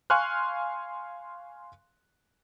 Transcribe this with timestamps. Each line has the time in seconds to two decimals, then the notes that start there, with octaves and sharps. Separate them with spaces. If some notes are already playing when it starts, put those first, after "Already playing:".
0.10 F5 G#5 C6 C#6 F6 F#6